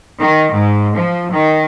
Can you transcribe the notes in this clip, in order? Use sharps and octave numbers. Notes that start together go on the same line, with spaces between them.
D#3
G#2
F3
D#3